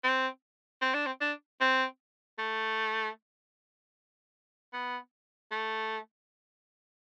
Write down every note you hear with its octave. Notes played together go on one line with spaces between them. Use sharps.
C4
C4
D4
C4
D4
C4
A3
B3
A3